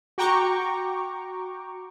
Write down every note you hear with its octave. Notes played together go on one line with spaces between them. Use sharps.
F#4 G5 A#5 C#6 D6